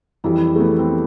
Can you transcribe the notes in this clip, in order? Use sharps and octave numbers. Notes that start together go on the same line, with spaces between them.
F2 E3 G3 E4
A3
B3
C4